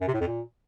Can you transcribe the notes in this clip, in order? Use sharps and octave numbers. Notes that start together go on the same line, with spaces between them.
F#2
C3
A2
F2
A#2